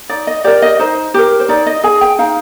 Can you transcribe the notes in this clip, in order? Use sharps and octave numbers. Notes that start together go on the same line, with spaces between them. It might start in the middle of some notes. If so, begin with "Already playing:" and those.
D#4 D5
D#5
G4 A#4 D5
D#5
D#4 C5
G4 A#4
C5
D#4 D5
D#5
G#4 G#5
G5
D#4 F5